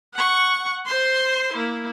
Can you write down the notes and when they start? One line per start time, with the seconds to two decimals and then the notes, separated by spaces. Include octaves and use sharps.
0.14 F#5 C#6
0.86 C5 C6
1.53 A#3 E4